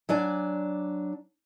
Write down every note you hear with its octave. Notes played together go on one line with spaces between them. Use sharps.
F#3 D4 D5 G#5